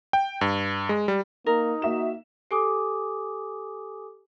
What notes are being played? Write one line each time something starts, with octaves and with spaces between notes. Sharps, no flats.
G5
G2
G#3
G3
A#3 D#4 A#4
A#3 F#4 E5 E7
G4 A4 G#5 D6 D#6